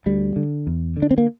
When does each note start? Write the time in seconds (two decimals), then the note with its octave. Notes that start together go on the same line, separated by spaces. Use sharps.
0.06 D2 G3
0.36 D3
0.67 E2
0.97 D3
1.02 D4
1.11 C4
1.18 A#3